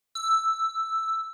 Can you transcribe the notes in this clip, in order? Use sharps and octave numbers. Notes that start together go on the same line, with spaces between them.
E6